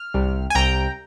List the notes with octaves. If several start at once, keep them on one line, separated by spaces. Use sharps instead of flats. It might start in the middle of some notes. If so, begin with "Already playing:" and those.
Already playing: F6
C2 C3 G3
G#5
C2 C3 G3 G5 A#5